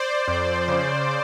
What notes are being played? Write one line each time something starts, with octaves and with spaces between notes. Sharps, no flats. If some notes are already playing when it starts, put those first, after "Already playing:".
Already playing: C5 D5
F2
C#3